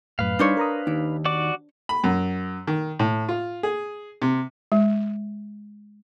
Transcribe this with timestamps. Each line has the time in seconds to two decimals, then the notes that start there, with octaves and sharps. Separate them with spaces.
0.19 F#2 A2 B4 F5
0.39 G3 D4 D#4 C5 C#5
0.57 A#4 A#5 D#6
0.87 D#2 D#4
1.25 F#4 D5 D6
1.89 B5
2.04 F#2
2.67 D#3
3.00 A2
3.29 F4
3.63 G#4
4.22 C3
4.72 G#3